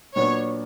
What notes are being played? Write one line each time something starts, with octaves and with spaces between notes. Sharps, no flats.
A#2 F#3 B3 D4 C#5